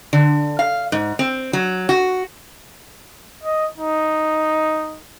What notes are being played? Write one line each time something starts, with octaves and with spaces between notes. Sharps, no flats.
D3
F5
G#2
C4
F#3
F#4
D#5
D#4